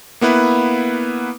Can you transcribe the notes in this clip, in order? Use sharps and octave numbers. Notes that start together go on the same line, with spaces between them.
A#3 B3 E4 B4